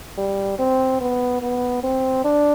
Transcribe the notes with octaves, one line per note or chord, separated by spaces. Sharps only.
G3
C4
B3
B3
C4
D4